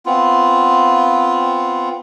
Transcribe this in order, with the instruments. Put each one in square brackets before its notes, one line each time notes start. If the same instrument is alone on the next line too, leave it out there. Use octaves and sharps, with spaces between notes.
[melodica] B3 C4 F4